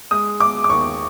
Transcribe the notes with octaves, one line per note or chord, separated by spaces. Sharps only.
G#3 D#6
G#3 D6
D6
D#2 C#6